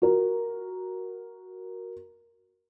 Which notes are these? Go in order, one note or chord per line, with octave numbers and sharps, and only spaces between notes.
F#4 A#4